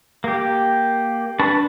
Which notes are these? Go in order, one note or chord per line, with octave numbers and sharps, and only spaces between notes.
A#3 G4
D4 B4 A5 B5 C#6